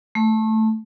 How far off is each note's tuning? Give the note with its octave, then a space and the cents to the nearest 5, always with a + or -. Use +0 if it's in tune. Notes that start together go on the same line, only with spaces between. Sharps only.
A3 +0 C#6 -35